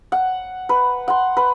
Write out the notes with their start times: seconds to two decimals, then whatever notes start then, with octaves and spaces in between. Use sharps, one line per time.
0.12 F#5
0.69 B4
1.08 F#5 C6
1.37 B4